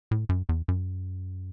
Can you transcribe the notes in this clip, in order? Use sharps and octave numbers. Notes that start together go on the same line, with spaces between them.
A2
F#2
E2
F#2